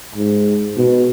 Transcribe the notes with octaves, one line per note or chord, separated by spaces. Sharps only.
G#2
B2